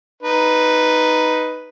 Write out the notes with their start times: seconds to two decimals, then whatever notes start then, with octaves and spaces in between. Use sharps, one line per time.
0.23 D#4 B4